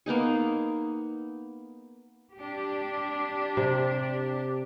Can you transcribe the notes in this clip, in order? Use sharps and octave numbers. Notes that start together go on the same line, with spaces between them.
A#3 B3 D#4 G#4
D4 G4
C3